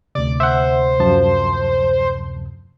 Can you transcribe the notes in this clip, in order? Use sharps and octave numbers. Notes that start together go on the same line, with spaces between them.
D2 C3 D5
C5 E5 F#5
F#2 F3 A5